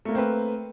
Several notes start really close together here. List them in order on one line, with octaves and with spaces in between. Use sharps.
A3 A#3 A#4 C4 B4